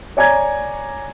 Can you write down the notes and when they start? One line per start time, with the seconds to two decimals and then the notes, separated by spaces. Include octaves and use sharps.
0.17 C#5 D5 G#5 A#5 G#6